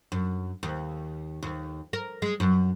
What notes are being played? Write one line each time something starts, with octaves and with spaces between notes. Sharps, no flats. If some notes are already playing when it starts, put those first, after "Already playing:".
F#2
D#2
D#2
A#4
G#3
F#2